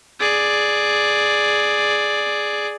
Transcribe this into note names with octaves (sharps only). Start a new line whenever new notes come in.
G#4 D5